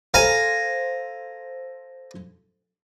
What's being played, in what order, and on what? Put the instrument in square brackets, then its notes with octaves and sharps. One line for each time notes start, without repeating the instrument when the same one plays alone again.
[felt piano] A4 C5 [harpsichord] F5 G#5 A#5